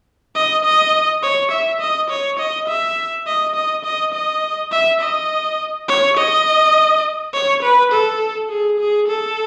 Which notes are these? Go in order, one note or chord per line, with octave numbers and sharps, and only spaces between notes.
D#5
D#5
C#5
E5
D#5
C#5
D#5
E5
D#5
D#5
D#5
D#5
E5
D#5
C#5
D#5
C#5
B4
A4
G#4
G#4
A4